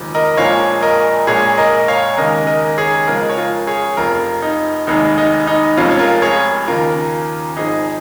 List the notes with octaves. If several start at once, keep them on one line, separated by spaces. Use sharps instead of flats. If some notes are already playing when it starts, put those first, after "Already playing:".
Already playing: F1 D#2 C#3 F3 G#3
A#4 D#5
A#1 A#2 F3 G#3 C#5 F5
A#4 D#5
A#1 A#2 G#3 G#4 C#5
A#4 D#5
C#5 F5
D#2 C#3 G#3 A#4 D#5
A#4 D#5
G#4 C#5
C#2 C#3 F3 G#3 F4 A#4
D#5
C#5
F4 A#4
G#4 C#5
F1 F2 F3 F4 A#4
D#4
F1 D#2 D#3 G#3 D#4
D#4
D#4
F1 F2 F3 G#3 C#4 F4
C#5
F4 A#4
G#4 C#5
D#2 C#3 F3 F4 A#4
G#1 G#2 F3 D#4 G#4